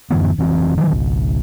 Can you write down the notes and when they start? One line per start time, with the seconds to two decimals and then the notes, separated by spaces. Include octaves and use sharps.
0.10 F#2 D3 E3 B3
0.38 F1 E3 C4
0.78 D#3 F3 F#3
0.91 G#1 C#2